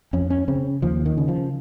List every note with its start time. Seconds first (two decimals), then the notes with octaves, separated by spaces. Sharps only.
0.13 F2 C#4
0.30 C#4
0.48 C#3 C4
0.82 D#2 F3
1.06 D#3
1.17 C#3
1.28 F3